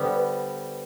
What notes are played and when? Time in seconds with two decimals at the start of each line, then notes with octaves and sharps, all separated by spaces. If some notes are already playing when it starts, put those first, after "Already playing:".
Already playing: D3 G3 B3 B4 C5
0.15 B4